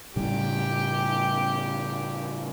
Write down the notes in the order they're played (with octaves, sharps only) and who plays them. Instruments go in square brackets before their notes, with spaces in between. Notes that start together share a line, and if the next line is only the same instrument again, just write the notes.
[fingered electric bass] A2 C#3 G3 [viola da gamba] G4